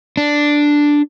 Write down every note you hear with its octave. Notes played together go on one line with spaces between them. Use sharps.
D4